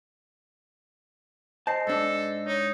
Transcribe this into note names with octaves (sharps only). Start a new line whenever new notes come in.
C5 D#5 A5 C7
G#2 D4 A4
D#4 C#5